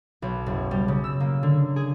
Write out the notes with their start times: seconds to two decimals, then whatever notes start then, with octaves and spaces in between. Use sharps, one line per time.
0.22 B1
0.46 F#1
0.71 G3
0.88 C#3
1.04 E6
1.20 A#3
1.43 D3
1.76 G#4